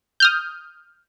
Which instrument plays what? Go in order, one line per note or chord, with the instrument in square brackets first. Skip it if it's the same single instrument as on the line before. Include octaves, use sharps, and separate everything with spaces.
[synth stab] D#6 F6 G6